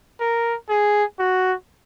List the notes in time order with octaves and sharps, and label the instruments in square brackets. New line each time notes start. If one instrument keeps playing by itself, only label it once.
[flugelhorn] A#4
G#4
F#4